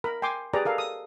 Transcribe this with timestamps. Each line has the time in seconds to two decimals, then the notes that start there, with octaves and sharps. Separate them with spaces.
0.04 A#4 B5
0.22 G5 G#5 C6 D6
0.53 G4 G#4 B4 D5 A#5
0.65 A4 A#4 F5
0.78 D#6